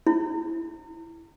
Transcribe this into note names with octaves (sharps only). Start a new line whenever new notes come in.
E4